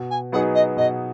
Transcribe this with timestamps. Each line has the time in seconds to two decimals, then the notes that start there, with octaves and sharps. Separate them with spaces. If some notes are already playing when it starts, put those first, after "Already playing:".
Already playing: B2
0.10 G#5
0.32 F#3 B3 D#4 G#4 F#5
0.54 D#5
0.77 B2 D#5